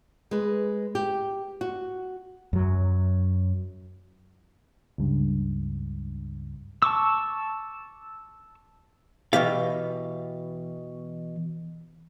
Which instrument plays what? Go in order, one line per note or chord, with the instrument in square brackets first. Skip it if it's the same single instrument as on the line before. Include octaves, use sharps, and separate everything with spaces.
[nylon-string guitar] G#3 B4
G4
F#4
[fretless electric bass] F#2 F#3
[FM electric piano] C#2 G2
[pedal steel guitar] A5 C#6 D6 E6
[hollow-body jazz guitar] B2 E3 G4 F5